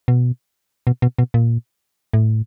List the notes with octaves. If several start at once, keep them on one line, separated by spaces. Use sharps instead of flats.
B2
B2
B2
B2
A#2
A2